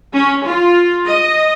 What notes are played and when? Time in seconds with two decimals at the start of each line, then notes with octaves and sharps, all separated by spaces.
0.13 C#4
0.45 F4
1.06 D#5